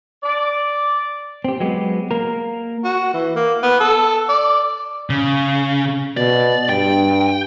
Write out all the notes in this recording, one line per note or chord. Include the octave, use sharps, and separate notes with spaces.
D5
C4 G4
F#3 G#3 B3 G4
A#3 A#4
F#4
E3
A#3
B3
A4
D5
C#3
B2 D5
G2 G5